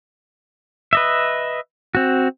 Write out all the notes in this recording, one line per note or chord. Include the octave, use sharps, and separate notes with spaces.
B4 D#5 E5
C4 F#4